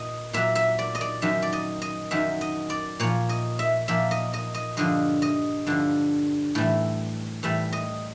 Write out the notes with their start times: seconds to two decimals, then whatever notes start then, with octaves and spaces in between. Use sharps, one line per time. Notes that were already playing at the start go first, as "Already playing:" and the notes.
Already playing: A#2 D#5
0.33 A#2 F#3 E5
0.55 E5
0.79 D5
0.95 D#5
1.01 D5
1.22 F#2 D#3 F#3 E5
1.42 D5
1.53 D#5
1.82 D#5
2.11 F#2 D#3 F#3 E5
2.41 D#5
2.70 D5
3.00 A#2 F3 C#5
3.29 D#5
3.59 E5
3.88 A#2 F3 E5
4.11 D#5
4.33 D#5
4.54 D#5
4.77 G2 D3 F3 D#5
5.22 D#5
5.66 G2 D3 F3
6.55 A2 E3 G3
7.43 A2 E3 G3 E5
7.73 D#5